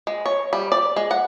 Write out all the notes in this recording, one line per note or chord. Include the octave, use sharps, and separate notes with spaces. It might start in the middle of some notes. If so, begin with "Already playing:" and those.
G#3
C#5
G3
D5
G#3
F#5